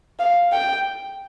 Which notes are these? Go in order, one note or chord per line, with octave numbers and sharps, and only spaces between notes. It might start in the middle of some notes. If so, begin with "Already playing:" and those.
F5
G5